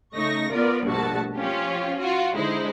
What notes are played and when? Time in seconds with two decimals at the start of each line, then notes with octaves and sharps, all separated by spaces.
0.15 C#3 A3 D#4 C#6 A#6
0.52 B3 F4 A#4 D5
0.84 A#1 G2 B2 A3 F#4 A5
1.37 F3 C#4 F4 G4
1.99 F4 F#4
2.35 D3 G#3 D#4 E4 C5